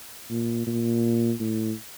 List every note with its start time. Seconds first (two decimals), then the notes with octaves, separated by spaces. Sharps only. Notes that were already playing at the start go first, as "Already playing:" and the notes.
0.31 A#2
0.67 A#2
1.40 A2